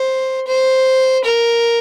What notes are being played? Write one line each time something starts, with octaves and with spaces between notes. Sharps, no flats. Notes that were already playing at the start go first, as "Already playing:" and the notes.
Already playing: C5
C5
A#4